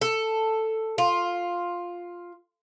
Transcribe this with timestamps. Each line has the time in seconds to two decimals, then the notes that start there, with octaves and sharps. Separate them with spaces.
0.01 A4
0.98 F4